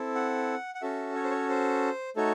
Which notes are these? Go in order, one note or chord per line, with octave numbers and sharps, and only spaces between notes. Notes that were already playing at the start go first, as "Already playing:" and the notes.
Already playing: C4 E4 A4
F#5
F#5
C#4 F#4 A4 E5
C#5
C5
C#5
C5
A3 D#4 F#4 A4 C#5